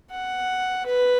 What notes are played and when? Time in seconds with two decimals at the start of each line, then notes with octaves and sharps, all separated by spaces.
0.10 F#5
0.86 B4